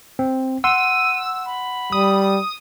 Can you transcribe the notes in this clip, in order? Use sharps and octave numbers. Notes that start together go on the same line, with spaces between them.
C4
F#5 C6 E6 D#7
B5
G3 D#6